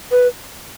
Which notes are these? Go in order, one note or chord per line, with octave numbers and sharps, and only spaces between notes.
B4